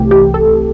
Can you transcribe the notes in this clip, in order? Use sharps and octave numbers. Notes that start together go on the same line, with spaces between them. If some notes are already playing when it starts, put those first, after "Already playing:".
Already playing: C2 C3 E3 A3 G4
G4
A4